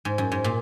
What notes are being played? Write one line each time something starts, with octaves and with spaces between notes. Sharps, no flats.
G#2
F#2
G#2
A#2